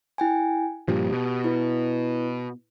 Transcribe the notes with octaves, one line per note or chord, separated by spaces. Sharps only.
E4 G5 G#5
G2 A#2 F3 G4
B2
E4 B4